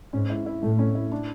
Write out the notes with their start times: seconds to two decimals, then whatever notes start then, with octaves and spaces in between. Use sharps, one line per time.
0.13 G#2 C#4
0.30 E4
0.46 E4
0.63 A2 A3
0.79 C#4
0.95 E4
1.12 D4